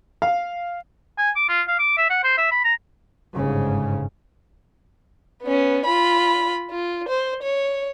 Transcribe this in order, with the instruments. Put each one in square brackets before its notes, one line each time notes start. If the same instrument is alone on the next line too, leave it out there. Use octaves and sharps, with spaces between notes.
[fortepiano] F5
[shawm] G#5
D6
F4
F5
D6
E5
F#5
C5
E5
B5
A#5
[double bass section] G1 G#2 C#3
[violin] B3 C#4
F4 B5
F4
C5
C#5